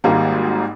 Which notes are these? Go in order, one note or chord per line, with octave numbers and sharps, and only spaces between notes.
G#1 G#2 D#3 G3 A#3